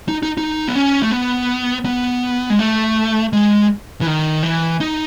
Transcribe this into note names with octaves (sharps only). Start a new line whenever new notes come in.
D#4
D#4
D#4
B3
C#4
A3
B3
B3
G#3
A3
G#3
E3
D#3
E3
D#4